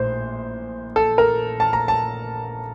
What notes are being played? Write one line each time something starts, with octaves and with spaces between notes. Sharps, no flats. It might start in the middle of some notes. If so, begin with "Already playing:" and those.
Already playing: A#1 A2 C5
A4
A#4
A5
A#5
A5